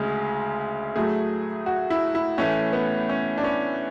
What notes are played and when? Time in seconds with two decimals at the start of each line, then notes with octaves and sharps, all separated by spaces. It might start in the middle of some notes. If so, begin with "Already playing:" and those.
Already playing: D2 C#3 G#3
0.96 A2 F#3 A3 G#4
1.66 F#4
1.90 E4
2.15 E4
2.38 A2 E3 A3 C#4
2.73 B3
3.09 C#4
3.38 D4
3.44 C#4